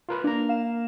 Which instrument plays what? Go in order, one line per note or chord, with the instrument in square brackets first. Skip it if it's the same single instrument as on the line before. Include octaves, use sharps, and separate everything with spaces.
[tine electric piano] F4 A#4 B4
[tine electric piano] A#3 A#5 [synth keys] D4
[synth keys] F5 E7